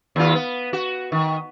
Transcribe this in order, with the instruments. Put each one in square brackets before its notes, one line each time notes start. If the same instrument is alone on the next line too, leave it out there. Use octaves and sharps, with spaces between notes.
[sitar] D#2 F4
B3
F#4
D#3